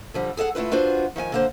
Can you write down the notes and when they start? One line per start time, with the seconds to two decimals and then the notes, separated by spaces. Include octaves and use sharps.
0.14 D3 F3 G3
0.37 G#4 A4 D#5 F#5
0.55 A3 E4 F4 B4
0.71 D4 F4 F#4 B4 C5
1.16 D#3 F3 E5 G#5
1.32 D3 A#3 C5